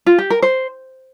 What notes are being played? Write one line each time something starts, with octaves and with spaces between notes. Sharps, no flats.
F4
G4
A#4
C5